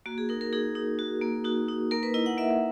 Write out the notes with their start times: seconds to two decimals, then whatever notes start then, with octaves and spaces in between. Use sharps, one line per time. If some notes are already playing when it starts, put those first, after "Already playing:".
0.06 A#3 F#4
0.18 G#4
0.29 D#4 A#4
0.41 A#4
0.53 D#4 G#4
0.75 D#4
0.99 F#4
1.21 A#3
1.44 D#4 F#4
1.69 D#4
1.91 A#3 A#4
2.03 B4
2.14 E4 D#5
2.26 F#5
2.38 A#3 E5